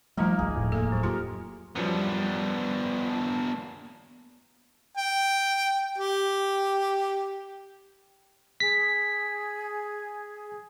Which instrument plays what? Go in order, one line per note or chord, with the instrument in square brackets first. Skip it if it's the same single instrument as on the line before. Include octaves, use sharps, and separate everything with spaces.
[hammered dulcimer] D#3 A#3 [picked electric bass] F3 G3 [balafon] A3 D#4 F4
[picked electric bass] G#1 C#2 [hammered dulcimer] G#4
[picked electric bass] D#1 F2 A2
[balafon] A#3 A4
F#3
[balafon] F4 G4 [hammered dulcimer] A#4
[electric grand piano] F#2 F3 G3 [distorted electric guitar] B3 D4
[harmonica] G5
G4
[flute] G#4 [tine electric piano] B6